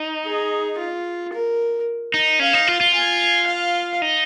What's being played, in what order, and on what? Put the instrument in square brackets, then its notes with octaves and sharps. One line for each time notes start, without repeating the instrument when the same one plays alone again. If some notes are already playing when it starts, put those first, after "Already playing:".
Already playing: [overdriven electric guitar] D#4
[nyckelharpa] G#4
F4
A#4
[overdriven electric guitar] D#4
[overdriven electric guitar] C#4 [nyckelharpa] F5
[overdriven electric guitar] D#4
F4
F4
[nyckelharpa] G#5
F5
[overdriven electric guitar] D#4